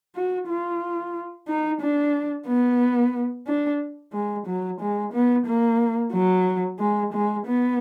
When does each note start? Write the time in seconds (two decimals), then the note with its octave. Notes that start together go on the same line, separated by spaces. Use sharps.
0.15 F#4
0.48 F4
1.48 D#4
1.81 D4
2.48 B3
3.47 D4
4.13 G#3
4.47 F#3
4.80 G#3
5.13 B3
5.46 A#3
6.13 F#3
6.79 G#3
7.13 G#3
7.46 B3